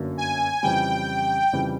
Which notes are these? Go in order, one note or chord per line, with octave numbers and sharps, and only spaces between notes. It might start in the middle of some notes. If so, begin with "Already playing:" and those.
Already playing: G1 F#2 D3 F#3 A#3
G#5
F2 C#3 E3 G3 G5
F2 C#3 E3 G3